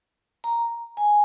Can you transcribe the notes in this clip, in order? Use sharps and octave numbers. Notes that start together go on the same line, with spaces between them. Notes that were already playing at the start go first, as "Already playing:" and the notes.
A#5
G#5